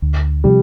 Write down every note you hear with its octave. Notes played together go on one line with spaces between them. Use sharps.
D2
C3 F3 G3